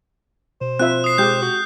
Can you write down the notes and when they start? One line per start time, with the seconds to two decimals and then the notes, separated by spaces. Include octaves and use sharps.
0.61 B2 C5
0.79 C4 F4 E5 F#6
1.04 D#6 C7
1.18 G#3 G4 F#6 G6
1.42 F#4